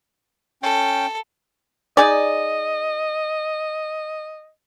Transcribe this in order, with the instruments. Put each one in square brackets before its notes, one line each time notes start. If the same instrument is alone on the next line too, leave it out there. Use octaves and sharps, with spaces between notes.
[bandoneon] C#4 G5 [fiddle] A4
[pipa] D#4 G#4 D5 [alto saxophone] D#5